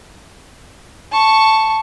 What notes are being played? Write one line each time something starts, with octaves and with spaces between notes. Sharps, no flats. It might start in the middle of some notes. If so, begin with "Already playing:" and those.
A5 C#6